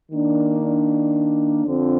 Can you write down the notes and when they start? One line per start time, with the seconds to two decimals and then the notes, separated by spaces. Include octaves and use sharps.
0.12 D#3 A#3 D4
1.65 F2 D3 F3 C4